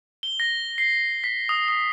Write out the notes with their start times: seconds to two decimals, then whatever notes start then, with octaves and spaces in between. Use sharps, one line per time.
0.23 G7
0.40 A#6
0.78 C7
1.24 B6
1.49 D#6
1.68 D#6